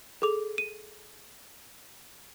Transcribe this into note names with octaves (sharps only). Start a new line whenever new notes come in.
G#4 A4 D6 F7
D#7